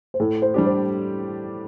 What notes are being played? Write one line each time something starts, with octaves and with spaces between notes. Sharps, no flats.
C5
A2 A4
C5
G3 D4 G4
C5